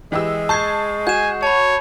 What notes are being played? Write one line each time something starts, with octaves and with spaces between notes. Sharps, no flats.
E3 G#3 G4 E6
A5 C#6 G6 G#6 C7
F#4 G#5 G6 E7
C#5 A5 B5